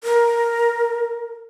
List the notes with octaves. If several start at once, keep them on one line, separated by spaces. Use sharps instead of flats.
A#4